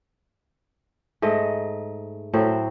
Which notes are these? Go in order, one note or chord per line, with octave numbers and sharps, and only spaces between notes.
G#2 A3 D#5
A2 F#3 C4 C5